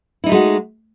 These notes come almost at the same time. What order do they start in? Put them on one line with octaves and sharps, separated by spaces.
E4 D#4 A3 G#3 F#4